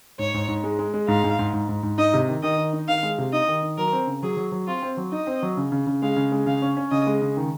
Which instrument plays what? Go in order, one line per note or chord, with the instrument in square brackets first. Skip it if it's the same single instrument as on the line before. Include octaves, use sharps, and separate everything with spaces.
[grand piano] G#2 [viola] C#5
[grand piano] G#2
G#2
G#3
G#3
G#3
[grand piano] G#2 [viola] F5
[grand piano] G#2
G#2
G#2
G#2
G#2
[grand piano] D#4 [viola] D#5
[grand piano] C3
D#3
[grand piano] D#3 [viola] D#5
[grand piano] D#3
D#4
[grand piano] D#3 [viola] F5
[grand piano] G#3
C3
[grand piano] D#4 [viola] D#5
[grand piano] D#3
D#3
[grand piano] F#3 [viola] A#4
[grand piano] C4
C#3
[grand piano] F#3 [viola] G#4
[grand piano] F#3
F#3
[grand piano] C4 [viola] F4
[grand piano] C4
F#3
[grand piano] D#4 [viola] D#5
[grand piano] C4
F#3
C#3
C#3
C#3
[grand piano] G#3 [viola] F5
[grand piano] C#3
G#3
[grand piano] C#3 [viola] F5
[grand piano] C#4
C#4
[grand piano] C#3 [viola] D#5
[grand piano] G#3
C#3
D#3